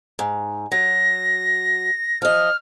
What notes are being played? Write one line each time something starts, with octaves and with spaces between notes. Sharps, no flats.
G#2
F#3 A#6
F3 D#5 F6